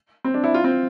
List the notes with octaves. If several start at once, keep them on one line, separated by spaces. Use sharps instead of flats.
C4
D4
E4
F4
C4